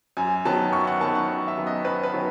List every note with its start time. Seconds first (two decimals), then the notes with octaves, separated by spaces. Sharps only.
0.17 F#2 G#5
0.45 D#3 F#3 B3 A5
0.73 F#2 C#6
0.87 F#5
1.01 D#3 F#3 B3 A5
1.15 F#5
1.29 F#2
1.48 E5
1.56 D#3 F#3 B3
1.67 D#5
1.85 F#2 B4
2.03 B4
2.14 D#3 F#3 B3